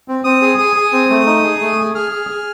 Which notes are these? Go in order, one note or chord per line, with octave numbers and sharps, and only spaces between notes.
C4
C4 D#6
G#4
G#4 D#6
G#4
C4
A3
D#4
G#4
A3
G#4
G#4 F6
G#4
G#4